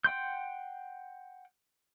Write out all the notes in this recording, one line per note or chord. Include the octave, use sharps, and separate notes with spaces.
F#5 G5 C6 G6